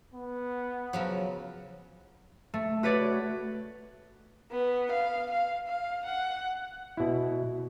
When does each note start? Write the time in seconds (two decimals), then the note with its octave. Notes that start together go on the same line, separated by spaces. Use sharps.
0.14 B3
0.93 C#3 F3 F#3
2.54 A3
2.83 F#4 B4 C#5 D5
4.51 B3
4.91 F5
5.31 F5
5.67 F5
6.05 F#5
6.97 B2 E4